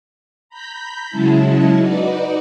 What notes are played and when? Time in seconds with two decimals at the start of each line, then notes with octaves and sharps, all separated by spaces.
0.49 A#5 B5 G6 B6
1.10 C#3 F#3 G#3 C#4 E4 A5
1.78 D#4 F#4 B4 D5